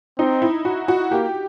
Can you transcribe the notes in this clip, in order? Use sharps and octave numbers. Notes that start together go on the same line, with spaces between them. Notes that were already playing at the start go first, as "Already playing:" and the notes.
C4 D#4
E4
F#4
F#4
A#3 G4